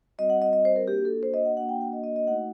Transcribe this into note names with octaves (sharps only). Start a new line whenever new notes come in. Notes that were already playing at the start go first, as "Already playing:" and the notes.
G3 C4 F#4 D#5
F#5
D#5
D#5
C5
A#4
A#3 D4 F#4 G4
A4
C5
D#5
F#5
A#3 D4 F#4 F#5
G5
F#5
D#5
D#5
D#5
A3 D#4 F#4 F#5